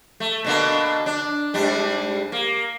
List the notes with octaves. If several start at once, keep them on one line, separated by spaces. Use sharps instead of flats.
A3
B2 D3 A#3
D4
G#2 G3 D4
A#3